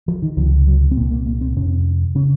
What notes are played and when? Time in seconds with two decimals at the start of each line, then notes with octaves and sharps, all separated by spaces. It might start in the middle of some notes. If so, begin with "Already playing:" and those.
0.08 F3
0.22 D#3
0.37 C#2 C3 F3
0.67 F#3
0.91 C4
0.97 C2 A#2 A#3
1.11 A#3
1.26 A#3
1.41 C4
1.56 F2 C3 C#4
2.15 C#3 C#4